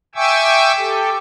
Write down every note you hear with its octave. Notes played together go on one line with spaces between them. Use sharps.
E5 G5 G#5 C#6 D6 E6
G4 A4